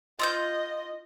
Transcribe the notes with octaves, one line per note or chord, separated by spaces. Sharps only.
F4 D#5 D#6 G6